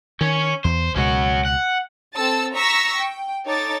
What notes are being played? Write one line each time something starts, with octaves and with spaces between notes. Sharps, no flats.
D#3 C#4 C#5
E2 C5
C#2 B2 G#3 C#4 F#4
F#5
C4 A4 A5 E6 A6
A#5 C#6 E6 A#6 B6
G5
D#4 A4 C#5 D6 A6